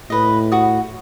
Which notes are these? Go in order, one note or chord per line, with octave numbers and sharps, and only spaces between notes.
A2 B4 D#5
F#4 D#6